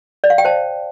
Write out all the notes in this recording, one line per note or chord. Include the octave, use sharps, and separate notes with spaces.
D5
F5
G5
C5 A5